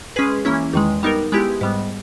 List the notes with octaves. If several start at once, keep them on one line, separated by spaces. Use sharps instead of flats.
G#3 C#4 G#4 B4
E3 A#3 C#4 E4
E2 D#3 G#3
G3 B3 D#4 A#4
G#3 B3 E4 G4
G#2 G3 B3